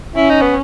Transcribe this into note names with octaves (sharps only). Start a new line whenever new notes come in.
C#4 E4
D#4
B3